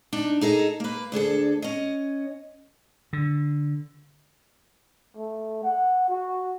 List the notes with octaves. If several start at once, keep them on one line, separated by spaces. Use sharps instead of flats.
D4 D#4
D#4 G#4 A4 D#5
A#3 B4
D2 D4 G#4 A4
C#4 D#5
D3
A3
F#5
F#4